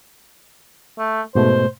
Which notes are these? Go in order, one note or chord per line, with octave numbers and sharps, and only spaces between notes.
A3
G#2 B2 A3 C5